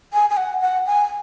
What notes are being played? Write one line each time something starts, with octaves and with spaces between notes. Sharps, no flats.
G#5
G#5
F#5
F#5
G#5